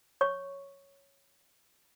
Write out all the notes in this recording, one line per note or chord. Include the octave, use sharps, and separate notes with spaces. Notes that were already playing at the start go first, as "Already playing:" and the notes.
C#5 C#6